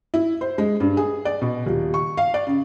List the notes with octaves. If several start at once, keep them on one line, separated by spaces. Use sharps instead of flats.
E4
C5
G#3
G2
G#4
D5
B2
D#1
C#6
F5
D5
C#3